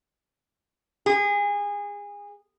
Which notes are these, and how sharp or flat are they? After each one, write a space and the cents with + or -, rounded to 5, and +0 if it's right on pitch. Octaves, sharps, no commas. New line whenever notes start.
G#4 -25